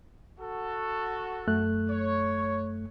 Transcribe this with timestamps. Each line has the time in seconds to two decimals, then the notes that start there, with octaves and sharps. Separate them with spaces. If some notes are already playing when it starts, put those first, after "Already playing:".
0.39 F#4 A4
1.47 F#2 A3 F#6
1.89 C#5